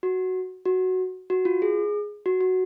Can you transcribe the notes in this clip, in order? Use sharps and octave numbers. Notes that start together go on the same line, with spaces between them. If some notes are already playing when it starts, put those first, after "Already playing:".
F#4
F#4
F#4
F4
G#4
F#4
F#4